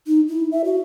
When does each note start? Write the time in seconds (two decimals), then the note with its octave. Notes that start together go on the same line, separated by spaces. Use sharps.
0.07 D#4
0.28 E4
0.51 E5
0.65 F#4